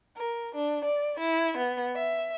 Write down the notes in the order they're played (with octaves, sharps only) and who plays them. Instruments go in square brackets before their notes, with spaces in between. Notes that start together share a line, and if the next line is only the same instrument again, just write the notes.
[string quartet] A#4
D4
D5
E4
B3
E5